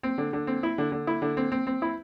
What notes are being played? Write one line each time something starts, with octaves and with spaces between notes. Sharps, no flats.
C4
D3
D3
C4
E4
D3
D3
E4
D3
C4
C4
C4
E4